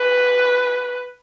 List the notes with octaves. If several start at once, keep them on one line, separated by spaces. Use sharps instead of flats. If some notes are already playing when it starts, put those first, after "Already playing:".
Already playing: B4